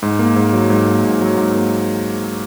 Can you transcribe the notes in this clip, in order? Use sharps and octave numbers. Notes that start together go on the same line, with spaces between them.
G#2
A#3
G#2
F#3
G#2
A#3
G#2
F#3
G#2
A#3